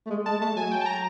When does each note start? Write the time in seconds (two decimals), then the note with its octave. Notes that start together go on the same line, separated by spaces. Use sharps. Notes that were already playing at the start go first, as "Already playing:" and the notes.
0.06 A3
0.10 G#3
0.25 G#3 A5
0.41 A3 A5
0.56 F#3 G#5
0.71 G5
0.81 A5
0.86 A#5